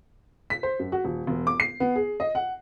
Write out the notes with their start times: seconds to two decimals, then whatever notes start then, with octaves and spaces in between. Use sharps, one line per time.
0.50 B6
0.63 C5
0.79 F#2
0.92 F#4
1.04 D#1
1.27 E1
1.47 D6
1.60 C7
1.80 B3
1.96 G#4
2.20 D#5
2.35 F#5